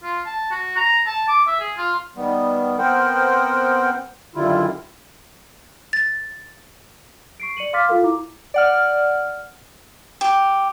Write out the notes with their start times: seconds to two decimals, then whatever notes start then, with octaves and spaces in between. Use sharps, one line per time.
0.03 F4
0.25 A5
0.51 F#4
0.77 A#5
1.06 A5
1.28 D6
1.47 E5
1.60 G#4
1.77 F4
2.17 D#3 G3 B3
2.79 B3 C4 A#4 C5 F#5 G5
4.35 F#2 D3 D#3 G3 E4 F4
5.93 A6
7.40 C#6 C7 D7
7.57 D5 C#7 D#7 F#7
7.73 F5 C6 D6 F6 A6 B6
7.88 F4 A4 A#4 F5
8.03 E4 A#5 D6
8.54 D5 F#5 F6
10.21 G4